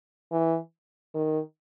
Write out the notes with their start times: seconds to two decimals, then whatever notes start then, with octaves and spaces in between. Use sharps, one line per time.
0.32 E3
1.14 D#3